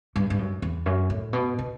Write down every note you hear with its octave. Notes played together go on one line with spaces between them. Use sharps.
G2
G2
F#2
E2
F#2
A2
B2
B2